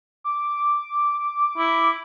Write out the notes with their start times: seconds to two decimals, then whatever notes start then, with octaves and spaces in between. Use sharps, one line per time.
0.24 D6
1.57 E4